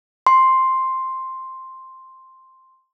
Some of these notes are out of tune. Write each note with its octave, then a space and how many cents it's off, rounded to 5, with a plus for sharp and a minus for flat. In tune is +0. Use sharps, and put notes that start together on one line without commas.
C6 +5